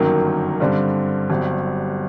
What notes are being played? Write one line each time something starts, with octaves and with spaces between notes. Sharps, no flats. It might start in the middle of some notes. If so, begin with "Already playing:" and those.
Already playing: G1 F#2 D#3 F#3 A#3
G2 D3 G3 C4
G1 G2 F#3 C4